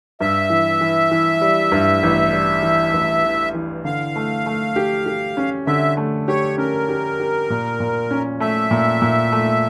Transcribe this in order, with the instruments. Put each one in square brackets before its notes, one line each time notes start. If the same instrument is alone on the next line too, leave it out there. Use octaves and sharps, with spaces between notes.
[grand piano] G2 [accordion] E5
[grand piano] E3
E3
E3
G3
G2
A1
G3
E3
A1
E3
E3
[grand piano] D3 [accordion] F5
[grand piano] A3
A3
G4
G4
C#4
[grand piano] D3 [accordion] E5
[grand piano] A3
[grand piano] G4 [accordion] C#5
[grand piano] C#4 [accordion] A#4
[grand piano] G4
G4
A#2
A#2
C#4
[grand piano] A3 [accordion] E5
[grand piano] A#2
A#2
A3